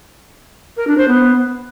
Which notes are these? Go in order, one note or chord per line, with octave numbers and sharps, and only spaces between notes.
A#4
D4
C5
B3